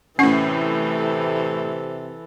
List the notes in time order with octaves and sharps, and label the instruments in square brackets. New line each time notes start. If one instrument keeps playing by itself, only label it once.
[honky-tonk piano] A2 C7 [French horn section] C3 [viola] E3 A4 [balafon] C#4 F#5 C#6